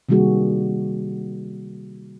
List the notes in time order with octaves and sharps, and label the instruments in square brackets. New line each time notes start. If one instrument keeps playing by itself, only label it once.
[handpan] C3 D#3 G3 A#3 F#4 G#4